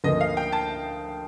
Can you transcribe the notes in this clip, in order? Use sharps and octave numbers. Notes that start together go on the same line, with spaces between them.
D2 D3 F3 A#3 D#5
F5
G5
A5